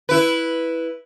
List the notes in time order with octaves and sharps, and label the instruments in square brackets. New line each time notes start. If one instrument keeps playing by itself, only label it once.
[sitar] E4 B4